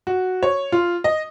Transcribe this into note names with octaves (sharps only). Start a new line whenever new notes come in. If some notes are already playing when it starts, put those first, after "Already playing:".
F#4
C#5
F4
D#5